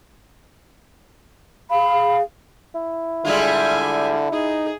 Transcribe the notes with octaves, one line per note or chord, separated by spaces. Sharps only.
G#4 F5 B5
E4
D3 G3 G#3 F4 E5 G#5
D#4 G#4